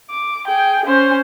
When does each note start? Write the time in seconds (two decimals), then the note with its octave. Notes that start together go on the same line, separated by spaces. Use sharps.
0.10 D6
0.47 G#4 G5
0.85 C#4 C5